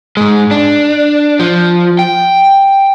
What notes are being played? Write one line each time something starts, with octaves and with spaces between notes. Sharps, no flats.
G#2 G#3
D4
F3
G5